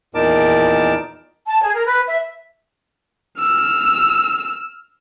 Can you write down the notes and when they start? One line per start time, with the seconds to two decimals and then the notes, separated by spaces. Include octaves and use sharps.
0.15 E2 A#2 D#4 A#4 A5 D6
1.46 A5
1.63 G#4
1.75 A#4
1.87 B4
2.07 E5
3.40 E6 F6